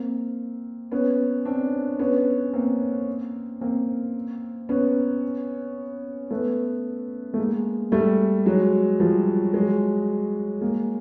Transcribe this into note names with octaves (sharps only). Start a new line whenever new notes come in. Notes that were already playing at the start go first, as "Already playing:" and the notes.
Already playing: A#3 C4
B3 C#4
C4 D4
B3 C#4
A#3 C4
A#3 C4
B3 C#4
A3 B3
A3
G#3 A#3
G3 A3
F#3 G#3
F3 G3
F#3 G#3
G#3 A#3